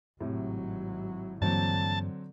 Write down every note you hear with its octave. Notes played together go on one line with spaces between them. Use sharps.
G#1 A2 C3 F#3
G2 D3 E3 F#3 A#3 C4 A5